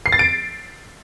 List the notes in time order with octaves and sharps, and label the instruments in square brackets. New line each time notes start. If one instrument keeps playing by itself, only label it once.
[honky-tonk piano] C7
A6
D7